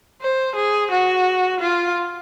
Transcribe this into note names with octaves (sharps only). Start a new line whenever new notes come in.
C5
G#4
F#4
F4